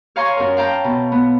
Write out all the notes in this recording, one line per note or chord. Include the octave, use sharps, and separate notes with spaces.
C#5 F5 G#5 A#5 C6 C#6
F#2 A#4
F5 G5 A5 A#5
B2
B3